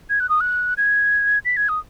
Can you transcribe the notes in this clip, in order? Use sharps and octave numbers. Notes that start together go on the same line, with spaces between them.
G#6
F#6
D#6
F#6
G#6
B6
G#6
D#6